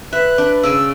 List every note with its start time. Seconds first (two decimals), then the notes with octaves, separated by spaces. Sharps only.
0.13 B4 E5 F#6
0.38 D4
0.63 C#3 D5 G#5 E6